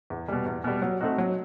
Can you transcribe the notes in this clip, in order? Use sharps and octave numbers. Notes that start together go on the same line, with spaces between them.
E2
B2 G3
E2
B2 G3
F#3
A3 C4 D#4 F#4
F#3